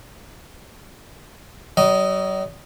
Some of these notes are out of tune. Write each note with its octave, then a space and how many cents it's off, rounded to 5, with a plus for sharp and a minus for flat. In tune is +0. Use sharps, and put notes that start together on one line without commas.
F#3 +45 D#5 +0